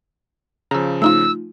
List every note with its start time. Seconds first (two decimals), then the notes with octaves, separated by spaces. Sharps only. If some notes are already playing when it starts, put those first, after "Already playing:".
0.71 C#3 F3 A#5 E6
1.02 A3 D#4 F4 E6